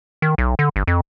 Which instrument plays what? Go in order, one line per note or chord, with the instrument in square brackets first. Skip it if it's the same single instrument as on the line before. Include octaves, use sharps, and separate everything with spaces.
[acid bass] D#3
B1
D3
G1
F2